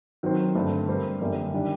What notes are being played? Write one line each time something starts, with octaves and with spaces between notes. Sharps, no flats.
D#3 F#3 C4
G2 D3 A3 C4
G3 C4 G4 A#4
F#2 D3 G3 A#3
D#3 G3 D4 G4 D5